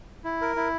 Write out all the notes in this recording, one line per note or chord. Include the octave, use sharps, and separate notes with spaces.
E4
A#4
E4